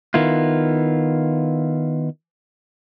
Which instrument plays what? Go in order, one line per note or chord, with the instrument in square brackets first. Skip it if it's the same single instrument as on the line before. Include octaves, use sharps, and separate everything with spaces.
[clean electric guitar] D#3 B3 E4 F4